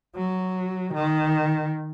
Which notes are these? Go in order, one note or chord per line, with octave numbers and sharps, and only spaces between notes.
F#3
D#3